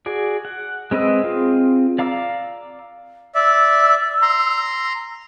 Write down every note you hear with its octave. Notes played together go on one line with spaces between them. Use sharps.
F#4 G#4 D5
F#5
G#3 C4 B4 D#5 E6
C4 F4 G#4
D5 F5 A#5 D6 E6
D5 E5 E6
A#5 C6